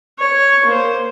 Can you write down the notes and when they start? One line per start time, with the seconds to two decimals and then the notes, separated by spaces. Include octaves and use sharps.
0.19 C#5
0.65 A#3 C5